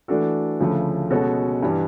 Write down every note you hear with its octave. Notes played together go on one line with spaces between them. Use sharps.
E3 A3 D4 F#4 A4
D2 C#3 F3 A3
B2 G#3 C#4 F#4 A4
G2 E3 G3